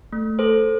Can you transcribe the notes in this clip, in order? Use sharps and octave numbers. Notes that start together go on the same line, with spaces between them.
A3
A4 C5